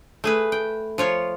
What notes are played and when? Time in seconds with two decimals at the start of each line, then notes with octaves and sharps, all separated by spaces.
0.24 A3 G#4 B4
0.52 G5
0.98 F3 F4 C#5